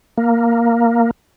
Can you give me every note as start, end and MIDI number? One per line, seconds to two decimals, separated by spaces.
0.18 1.11 58